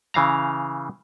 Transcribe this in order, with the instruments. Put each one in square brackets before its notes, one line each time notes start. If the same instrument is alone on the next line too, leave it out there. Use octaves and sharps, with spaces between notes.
[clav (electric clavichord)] C#3 E3 F5 A#5